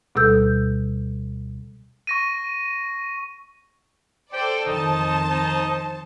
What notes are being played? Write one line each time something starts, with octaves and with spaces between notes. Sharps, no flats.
D2 B2 G3 A4 E6 G6
C#6 A#6 D#7
A4 C5 D5 G5
F2 D#3 D#4 C5 A5
D#4